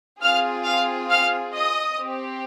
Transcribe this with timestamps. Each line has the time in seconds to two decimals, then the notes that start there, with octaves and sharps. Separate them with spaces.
0.22 C4 F4 G#4 F5 F6
0.66 F5 F6
1.10 F5 F6
1.55 D#5 D#6
1.99 C4 G4